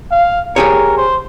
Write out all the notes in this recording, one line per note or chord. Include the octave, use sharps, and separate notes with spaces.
F5
G4 G#4 A#4 C#5
C5